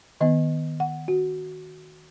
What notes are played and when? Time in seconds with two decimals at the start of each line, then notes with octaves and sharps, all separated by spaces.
0.21 D#3 B3 D#5
0.80 F#5
1.08 F#4